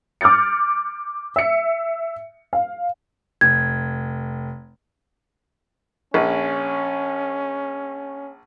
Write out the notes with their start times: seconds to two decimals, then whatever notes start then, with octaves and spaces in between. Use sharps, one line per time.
0.21 D6 F6 G6 A6 C#7
1.36 E5 C#7
2.53 F5
3.41 F1 G#6
6.14 A#1 C#4